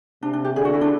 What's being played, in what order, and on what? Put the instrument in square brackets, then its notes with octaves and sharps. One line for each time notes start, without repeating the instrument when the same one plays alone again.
[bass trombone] C3 [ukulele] D4
[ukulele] D4
G4
[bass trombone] D3 [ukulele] G#4
[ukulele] F#4
E4
D4